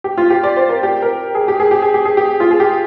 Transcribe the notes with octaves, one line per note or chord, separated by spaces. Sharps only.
G4
F4
G4
D5
C5
A#4
G4
A#4
G#4
G4
G#4
G4
G#4
G4
G#4
G4
F4
G#4
G4